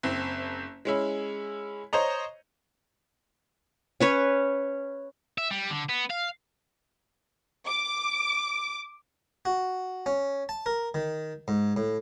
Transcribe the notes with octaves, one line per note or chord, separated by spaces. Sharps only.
F#1 C4
G#3 C#4 E4
C5 C#5 D#5 A#5
C#4 B4 C#5
E5
G3
D3
B3
F5
D6
F#4
C#4
A5
A#4
D#3
G#2
A2